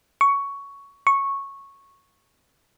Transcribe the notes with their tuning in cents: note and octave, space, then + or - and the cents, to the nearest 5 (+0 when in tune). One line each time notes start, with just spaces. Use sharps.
C#6 +10
C#6 -10